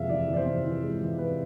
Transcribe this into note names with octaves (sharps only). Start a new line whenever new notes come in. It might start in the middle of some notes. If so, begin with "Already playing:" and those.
Already playing: F2 C3 G#3 E5 F5
E3 D5
E3
D5
C5
C3
E3
G#3
E3
C3 B4